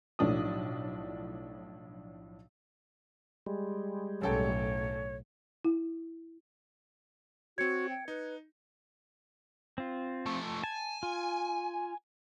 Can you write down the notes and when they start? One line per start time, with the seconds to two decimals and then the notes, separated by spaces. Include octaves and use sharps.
0.19 B1 A2 F3 D4 A4 D#6
3.46 G3 G#3
4.22 B1 F#2 A2 A4 C#5 G5
5.65 E4
7.58 C4 F#4 C#5 G#6 C#7
7.89 G5
8.08 D#4 B4
9.78 C4 F4
10.26 F3 A3
10.64 G#5 A5
11.03 F4